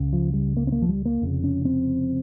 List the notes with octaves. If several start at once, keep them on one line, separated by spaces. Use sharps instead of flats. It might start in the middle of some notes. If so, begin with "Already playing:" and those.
Already playing: C#2 C#3
F3
G3
A#3
C4
A#3
F3
G3
A#3
F1 F2 C#3
C#4
C4